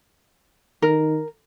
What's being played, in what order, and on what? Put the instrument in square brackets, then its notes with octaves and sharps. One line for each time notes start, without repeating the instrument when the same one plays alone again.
[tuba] D#3 [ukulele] A#4